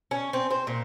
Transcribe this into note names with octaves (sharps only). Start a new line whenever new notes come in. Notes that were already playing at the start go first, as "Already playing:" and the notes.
C#4
C4
C5
A#2